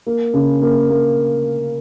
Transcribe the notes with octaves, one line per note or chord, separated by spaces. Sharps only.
A#3
C#3
A#3
A#3